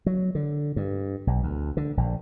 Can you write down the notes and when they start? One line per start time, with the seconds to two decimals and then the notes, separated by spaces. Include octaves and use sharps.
0.06 F#3
0.35 D3
0.76 G2
1.27 B1
1.43 D2
1.77 D3
1.97 A#1